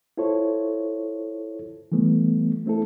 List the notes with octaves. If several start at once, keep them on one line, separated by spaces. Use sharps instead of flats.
E4 F4 A4 C5 C#5
E3 G3 A3 B3
A3 C4 E4 A4